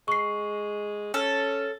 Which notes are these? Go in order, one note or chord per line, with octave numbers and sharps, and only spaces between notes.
G#3 C#6 C7
C#4 A4